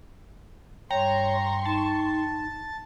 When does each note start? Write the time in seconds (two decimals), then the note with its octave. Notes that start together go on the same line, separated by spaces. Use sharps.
0.91 G2 C#5 G5 A#5 C6 C#6
1.65 D#4 A5